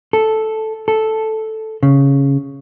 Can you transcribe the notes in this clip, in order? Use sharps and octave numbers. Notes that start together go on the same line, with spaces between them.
A4
A4
C#3